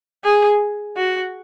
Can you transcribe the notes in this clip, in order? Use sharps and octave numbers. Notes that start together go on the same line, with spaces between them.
G#4
F#4